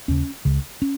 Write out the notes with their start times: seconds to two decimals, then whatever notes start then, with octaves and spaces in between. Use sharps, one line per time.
0.08 D#2 C#3 C#4
0.45 C#2 C#3
0.82 C#4